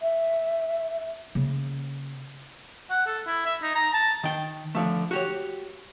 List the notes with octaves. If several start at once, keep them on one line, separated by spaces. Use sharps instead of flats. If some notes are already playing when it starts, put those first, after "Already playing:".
E5
C#3 A#3
F#5
A4
E4
E5
D#4
A#5
A5
D#3 G5
D3 F3 A3
F#4 G4 C#5